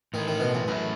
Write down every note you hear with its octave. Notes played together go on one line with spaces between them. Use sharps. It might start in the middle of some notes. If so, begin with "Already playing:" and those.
A2 D#3 E3 A3 E4
D#3
B2
E2
F#2 A2 E3 A3 E4